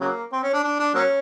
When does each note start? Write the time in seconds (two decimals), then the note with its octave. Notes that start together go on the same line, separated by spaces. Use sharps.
0.01 C#3 F#3 A#3
0.32 C4
0.43 C#4
0.53 D4
0.64 D4
0.79 D4
0.95 F#3 A#3 C#4